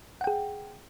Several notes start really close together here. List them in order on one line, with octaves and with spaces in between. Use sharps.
F#5 G5 G#4